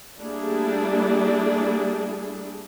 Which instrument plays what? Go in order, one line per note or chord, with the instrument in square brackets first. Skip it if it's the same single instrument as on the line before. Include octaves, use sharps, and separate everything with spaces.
[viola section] G3 A3 A#3 D4 E4 G#4